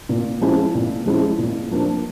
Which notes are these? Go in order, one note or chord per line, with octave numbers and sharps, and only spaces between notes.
A#2
F3 G#3 C#4 E4
A#2
F3 G#3 C#4 E4
A#2
F3 A#3 D4